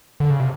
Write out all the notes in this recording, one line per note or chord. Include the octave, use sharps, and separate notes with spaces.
D3
C#3
C3